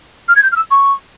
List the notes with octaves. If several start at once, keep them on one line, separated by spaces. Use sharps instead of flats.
F6
G#6
G6
F6
E6
C#6